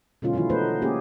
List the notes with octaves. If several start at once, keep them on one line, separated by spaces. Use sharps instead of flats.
B2 D3 F#3 G#3 C#4 F4
D#3 E3 F#3 E4 F4
A3 B3 D#4 B4 C5
A#3 C#4 G4 G#4